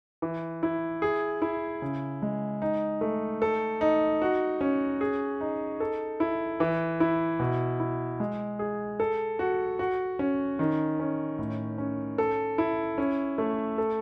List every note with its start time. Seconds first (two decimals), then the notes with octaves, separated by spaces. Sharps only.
0.22 E3
0.63 E4
1.02 G#4
1.42 E4
1.82 C#3
2.22 G#3
2.62 D#4
3.01 A3
3.42 A4
3.81 D#4
4.22 F#4
4.61 C#4
5.01 G#4
5.41 D#4
5.80 A4
6.20 E4
6.60 E3
7.00 E4
7.40 B2
7.80 E4
8.20 G#3
8.59 G#4
9.00 A4
9.39 F#4
9.79 F#4
10.19 C#4
10.59 D#3
10.99 C#4
11.38 A2
11.78 C#4
12.18 A4
12.58 E4
12.98 C#4
13.38 A3
13.78 A4